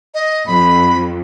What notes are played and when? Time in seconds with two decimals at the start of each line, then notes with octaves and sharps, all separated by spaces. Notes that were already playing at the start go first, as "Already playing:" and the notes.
0.14 D#5
0.47 F2 B5